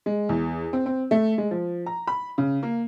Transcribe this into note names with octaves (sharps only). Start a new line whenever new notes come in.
G#3
E2
C4
C4
A3
G#3
F3
A#5
B5
C#3
A#3